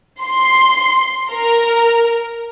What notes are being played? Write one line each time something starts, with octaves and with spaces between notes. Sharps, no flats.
C6
A#4